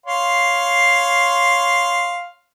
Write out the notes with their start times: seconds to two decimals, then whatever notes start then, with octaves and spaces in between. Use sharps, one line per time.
0.06 C#5 F5 C6